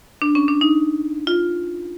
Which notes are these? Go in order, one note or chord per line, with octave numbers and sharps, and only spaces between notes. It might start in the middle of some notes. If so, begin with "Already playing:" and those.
D4
C#4
D4
D#4
F4